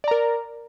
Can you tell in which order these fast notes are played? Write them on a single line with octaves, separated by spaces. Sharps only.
D5 A#5 A#4